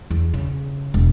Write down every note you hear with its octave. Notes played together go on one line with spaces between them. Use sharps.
E2
C#3
E1